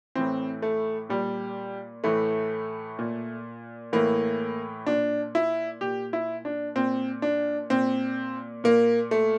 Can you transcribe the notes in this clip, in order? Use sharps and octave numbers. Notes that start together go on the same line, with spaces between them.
A2 E3 C4
A3
A#2 G3
A2 E3 A3
A#2
A2 E3 A#3
A#2 D4
E4
A#2 G4
E4
D4
A#2 C4
D4
A#2 C4
A#2 A#3
A3